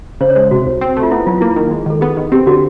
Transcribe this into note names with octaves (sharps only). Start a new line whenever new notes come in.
C#3 C5
C#5
G#3 C5
C3 F#4
C2
C4
A3
F4
B3 E4
F#3 F4
F4
A#3 E4
D#3
G#3
D#3 A4
B3 G#4
D#3
C4 G4
D3 F#4